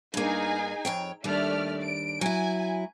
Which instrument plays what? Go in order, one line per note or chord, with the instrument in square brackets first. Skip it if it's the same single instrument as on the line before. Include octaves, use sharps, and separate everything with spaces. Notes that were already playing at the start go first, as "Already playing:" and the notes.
[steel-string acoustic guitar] G2 A#3 [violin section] D#4 G#4 G#5
[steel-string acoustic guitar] F2 C#5 G5
[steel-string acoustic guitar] D#2 G3 D4 [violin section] A3 D5 F6
[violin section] D7
[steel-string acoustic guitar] F#3 E4 [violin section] G#5